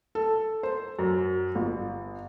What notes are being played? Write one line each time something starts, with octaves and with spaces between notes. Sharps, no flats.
A4
C5
F#2
G1